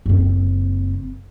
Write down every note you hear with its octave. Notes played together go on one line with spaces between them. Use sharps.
F#1 C4